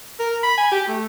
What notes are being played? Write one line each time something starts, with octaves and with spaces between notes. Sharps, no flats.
A#4
B5
G#5
G4
A3